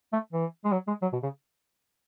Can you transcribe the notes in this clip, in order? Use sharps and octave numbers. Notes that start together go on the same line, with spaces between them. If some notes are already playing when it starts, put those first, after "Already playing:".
A3
E3
G#3
F#3
G#3
F#3
B2
C#3